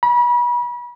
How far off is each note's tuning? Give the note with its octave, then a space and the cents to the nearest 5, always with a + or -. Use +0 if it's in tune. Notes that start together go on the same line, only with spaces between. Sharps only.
B5 -35